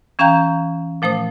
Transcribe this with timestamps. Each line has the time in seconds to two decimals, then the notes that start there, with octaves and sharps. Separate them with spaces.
0.19 E3 C#4 F5 G5 A#5 G6
1.02 A#2 F3 A3 C5 D#6